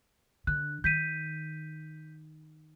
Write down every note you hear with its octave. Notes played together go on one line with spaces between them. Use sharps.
D3 F#6
D#3 G6 B6 D#7